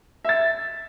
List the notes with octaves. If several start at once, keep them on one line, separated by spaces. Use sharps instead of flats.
E5 A6